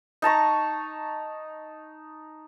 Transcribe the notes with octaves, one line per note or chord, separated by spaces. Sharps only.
D#4 A5 A#5 C#6